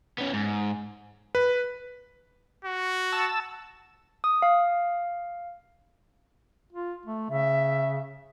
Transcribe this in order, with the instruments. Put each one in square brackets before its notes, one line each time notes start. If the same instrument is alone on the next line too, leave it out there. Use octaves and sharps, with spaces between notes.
[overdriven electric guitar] B3 C#4
G#2
[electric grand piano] B4
[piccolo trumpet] F#4
[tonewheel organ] A5 E6
[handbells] D#6
F5
[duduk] F4
A3
[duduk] C#3 [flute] E5